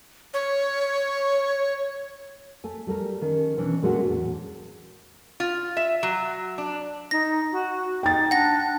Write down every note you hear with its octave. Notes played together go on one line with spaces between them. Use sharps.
C#5
A3 G#5
G3 A3 A#4
D#3 C#4
B2 E3 C#4 D4
A#2 G#3 A3 C#4 D4 F#4
E2 A2
F4
E5
F#3
D4
D#4 A#6
F#4
D#4 G5 A6
D4 F#5 A#6